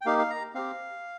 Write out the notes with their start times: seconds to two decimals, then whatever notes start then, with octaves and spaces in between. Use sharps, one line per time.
0.01 G5
0.05 A#3 D#4 G4 F5
0.18 F5
0.30 A#5
0.54 C4 G4 F5